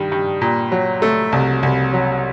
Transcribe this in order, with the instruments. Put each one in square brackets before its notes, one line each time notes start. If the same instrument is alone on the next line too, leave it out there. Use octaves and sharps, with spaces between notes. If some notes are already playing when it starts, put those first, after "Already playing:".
Already playing: [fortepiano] G2 D#3
G2
A#2
F#3
A3
C2
C2
F#3